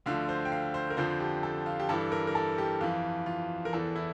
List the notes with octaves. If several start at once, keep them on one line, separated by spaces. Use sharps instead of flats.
D2 D3 F3 F5
C5
G5
F5
C5
A#4
F2 D3 F3 C5
G4
A4
F4
G4
G2 E3 A4
A#4
A#4
A4
G4
F2 E3 F4
F4
A#4
E2 E3 A4
E4